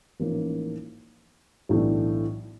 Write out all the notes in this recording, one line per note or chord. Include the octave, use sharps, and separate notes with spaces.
A1 G#2 F3 A#3 C#4
B1 A2 E3 A3 D4